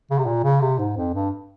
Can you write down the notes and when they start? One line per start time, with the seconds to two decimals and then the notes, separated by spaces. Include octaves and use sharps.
0.11 C#3
0.18 C3
0.26 A#2
0.44 C#3
0.61 C3
0.79 G#2
0.97 F2
1.14 G2